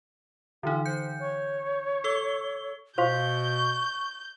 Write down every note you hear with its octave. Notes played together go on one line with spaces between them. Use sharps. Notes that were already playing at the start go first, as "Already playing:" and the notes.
D3 E3 D#4 F4
C5 G6 C#7
C#5
A4 E6 G7
B2 C5 F5 C6 C#6 G6